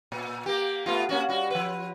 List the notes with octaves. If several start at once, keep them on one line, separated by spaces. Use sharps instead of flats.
A#2
A#3 G4
A3 B3 F4
A#3 C#4 F#4
G3 F#4
F3 B4